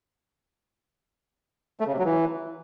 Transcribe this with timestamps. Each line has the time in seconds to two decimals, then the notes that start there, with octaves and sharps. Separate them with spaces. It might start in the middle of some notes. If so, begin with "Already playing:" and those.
1.80 A3
1.86 C#3
1.93 C3
1.99 F#3
2.05 E3